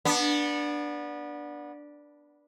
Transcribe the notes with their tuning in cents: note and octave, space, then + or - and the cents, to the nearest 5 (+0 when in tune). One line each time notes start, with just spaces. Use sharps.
B3 -25 D4 +0